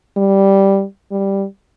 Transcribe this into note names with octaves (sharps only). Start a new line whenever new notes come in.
G3
G3